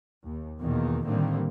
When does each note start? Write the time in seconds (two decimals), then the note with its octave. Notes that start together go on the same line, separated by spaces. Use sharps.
0.24 D#2
0.60 E2 B2 D#3 A#3
1.06 A2 D3 D#3 G3 A#3 C4